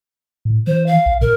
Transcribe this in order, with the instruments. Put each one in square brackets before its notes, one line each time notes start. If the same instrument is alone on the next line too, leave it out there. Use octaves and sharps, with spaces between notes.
[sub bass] A2
[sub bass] E3 [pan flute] C5
[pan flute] F5
[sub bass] B1
[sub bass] A#2 [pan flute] A#4